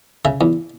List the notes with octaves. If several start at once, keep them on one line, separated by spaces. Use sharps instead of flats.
C#3 E5
E2